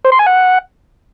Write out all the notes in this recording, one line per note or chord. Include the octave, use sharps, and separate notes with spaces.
C5
C6
G#5
F#5